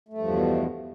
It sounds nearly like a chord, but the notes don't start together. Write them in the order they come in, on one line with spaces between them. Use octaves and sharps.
A3 G2 F3 E2 B2